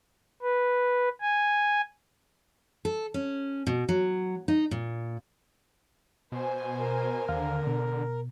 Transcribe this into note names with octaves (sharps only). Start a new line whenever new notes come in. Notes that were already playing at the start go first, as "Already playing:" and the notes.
B4
G#5
A4
C#4
B2
F#3
D#4
A#2
B2 C5 G#5
A#4
D#2 D3 F5 F6
B2